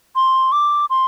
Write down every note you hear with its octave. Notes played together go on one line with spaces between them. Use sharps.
C6
D6
C6